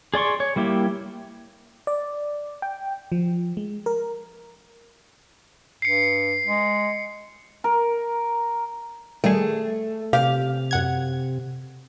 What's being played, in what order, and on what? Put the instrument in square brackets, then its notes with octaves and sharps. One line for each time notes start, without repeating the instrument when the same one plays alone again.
[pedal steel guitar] G#4 D5 C6 C#6
C#5
G3 A#3 E4 G4
[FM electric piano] D5
G5
F3
G#3
A#4
[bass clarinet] G2 [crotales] C7 C#7
[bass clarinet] G#3
[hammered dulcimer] A#4
[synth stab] D#3 G3 G#4 [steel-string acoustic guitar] A3
[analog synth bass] C3 [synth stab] G4 [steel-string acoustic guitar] F5
[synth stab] F#2 F#5 G#6